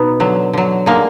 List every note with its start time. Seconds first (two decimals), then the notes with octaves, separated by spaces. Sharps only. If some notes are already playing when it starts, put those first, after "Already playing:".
Already playing: B2 B3 D#4
0.20 D3 F#3
0.53 D3 F#3
0.86 D3 G#3 A#3